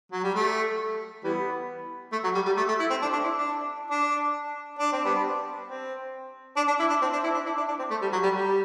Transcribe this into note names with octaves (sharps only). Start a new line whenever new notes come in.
F#3
G3
A3
E3 G3 B3
A3
F#3
G3
G3
A3
A3
E4
C4
D4
D4
E4
D4
D4
D4
C4
G3 B3 D4
C4
D4
D4
E4
D4
C4
D4
E4
D4
E4
D4
D4
C4
A3
G3
F#3
G3
G3